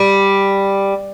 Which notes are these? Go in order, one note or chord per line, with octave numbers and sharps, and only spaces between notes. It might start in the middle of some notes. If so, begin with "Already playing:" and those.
Already playing: G3